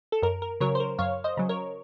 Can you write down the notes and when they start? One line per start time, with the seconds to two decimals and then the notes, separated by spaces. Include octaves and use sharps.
0.12 A4
0.22 F#2 A#4
0.42 A#4
0.60 C#3 F#3 A#4 C#5
0.75 C5
0.80 A#4
0.98 F#2 C#5 F5
1.24 C5 D#5
1.37 C#3 F#3
1.49 A#4 C#5